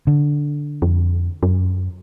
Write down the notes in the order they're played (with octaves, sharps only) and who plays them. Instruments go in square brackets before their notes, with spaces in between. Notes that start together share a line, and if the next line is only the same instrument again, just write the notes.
[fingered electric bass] D3
[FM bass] F2
F#2